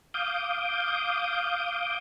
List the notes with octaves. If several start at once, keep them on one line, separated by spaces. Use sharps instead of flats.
F5 D6 D#6 G6